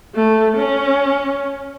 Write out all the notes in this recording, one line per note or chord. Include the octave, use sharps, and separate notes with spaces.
A3
C#4